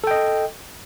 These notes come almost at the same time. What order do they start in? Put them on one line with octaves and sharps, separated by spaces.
A4 G5 D#5